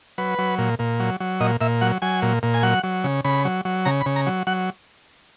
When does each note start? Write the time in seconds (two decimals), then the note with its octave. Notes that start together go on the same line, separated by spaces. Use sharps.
0.18 F#3 B4
0.39 F#3
0.58 A#2
0.79 A#2
1.00 F#3
1.20 F#3
1.40 A#2 D#5
1.61 A#2 E5
1.81 F#3 F#5
2.02 F#3 G#5
2.22 A#2
2.43 A#2
2.54 G#5
2.63 F#3 F#5
2.83 F#3
3.04 C#3
3.25 C#3 B5
3.45 F#3
3.65 F#3
3.85 C#3 A#5
4.01 B5
4.06 C#3
4.16 A#5
4.27 F#3
4.47 F#3 F#5